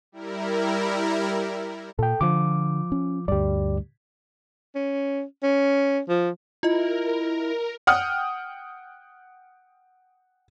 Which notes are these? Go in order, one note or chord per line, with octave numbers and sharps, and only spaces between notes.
G3 E4 A#4
A#2 A4 G5
D3 F3 F4 D6
C#4
D2 G2 G4 D5
C#4
C#4
F3
E4 F4 A#4 D#5
F#5 G5 D#6 F6